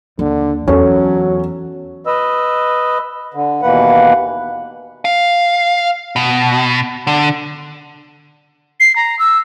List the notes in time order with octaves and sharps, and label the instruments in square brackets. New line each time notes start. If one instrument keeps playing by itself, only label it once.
[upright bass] D#2 [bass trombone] D3
[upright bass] E2 [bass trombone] F#3 [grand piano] C#4 A4
[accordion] B4 D#5 E6
D3
D#2 B2 E3 A#3 B4 F#5
[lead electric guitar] F5
B2
D3
[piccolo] C7
A#5
E6